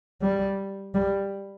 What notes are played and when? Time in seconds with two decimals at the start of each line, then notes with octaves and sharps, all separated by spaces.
0.22 G3
0.95 G3